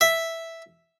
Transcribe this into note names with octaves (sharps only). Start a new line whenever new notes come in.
E5